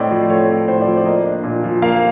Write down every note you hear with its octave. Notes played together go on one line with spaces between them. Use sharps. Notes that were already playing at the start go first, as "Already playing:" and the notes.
Already playing: A2 A3 C4 D5 D#5
F3
A3 C#5
C4 C#5
A2 C5
D5
F3
D5
A#3 D#5
D4
A#2
F3
A#3 F5